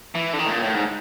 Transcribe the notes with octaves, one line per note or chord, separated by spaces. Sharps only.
E3
D3
D#3
A2
A#2
A2
G#2